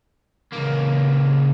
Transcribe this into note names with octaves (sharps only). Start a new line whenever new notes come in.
C#2 A#3